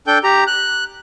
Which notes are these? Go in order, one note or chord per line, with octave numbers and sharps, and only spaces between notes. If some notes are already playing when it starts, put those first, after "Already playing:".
D4 A4 G5 G6
G4 A#5
F#6